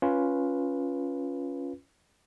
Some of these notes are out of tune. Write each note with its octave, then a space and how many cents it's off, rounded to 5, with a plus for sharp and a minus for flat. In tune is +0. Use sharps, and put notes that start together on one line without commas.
C#4 +0 F4 +0 B4 -10